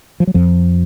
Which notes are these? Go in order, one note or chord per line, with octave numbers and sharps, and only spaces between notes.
F3
F#3
F2 F3